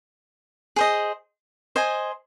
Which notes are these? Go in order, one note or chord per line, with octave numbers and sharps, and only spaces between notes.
G#4 C5 D#5
C5 D#5 G#5